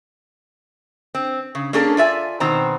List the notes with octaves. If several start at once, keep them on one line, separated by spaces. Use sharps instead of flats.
C4
C#3
A#3 C#4 D4 G#4 A4
F4 D5 E5 G#5
B2 D#3 C4 C5 A#5